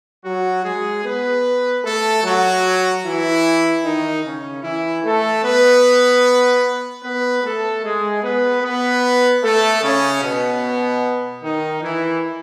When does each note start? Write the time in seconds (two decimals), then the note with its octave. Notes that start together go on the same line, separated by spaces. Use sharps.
0.25 F#3 F#4
0.65 G#3 G#4
1.05 B3 B4
1.84 A3 A4
2.24 F#3 F#4
3.04 E3 E4
3.84 D#3 D#4
4.24 C#3 C#4
4.63 E3 E4
5.04 A3 A4
5.44 B3 B4
7.04 B3 B4
7.43 A3 A4
7.84 G#3 G#4
8.23 B3 B4
8.63 B3 B4
9.43 A3 A4
9.83 C#3 C#4
10.22 B2 B3
11.43 D#3 D#4
11.82 E3 E4